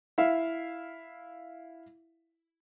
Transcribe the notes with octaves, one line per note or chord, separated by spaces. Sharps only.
E4 E5 F5